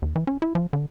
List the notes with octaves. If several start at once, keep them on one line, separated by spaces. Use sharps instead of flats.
D#2
E3
C#4
E4
F3
D3